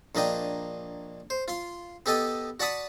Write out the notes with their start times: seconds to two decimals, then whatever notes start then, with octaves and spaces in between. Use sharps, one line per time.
0.15 A#1 A#3 D4 D#5 G5
1.30 C5
1.48 F4 C6
2.06 B3 G4 A4 D#5 A5
2.60 F#4 D5 F#5 A5 B5 D#6